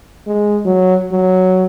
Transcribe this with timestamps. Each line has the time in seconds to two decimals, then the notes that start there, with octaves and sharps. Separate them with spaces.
0.27 G#3
0.65 F#3
1.12 F#3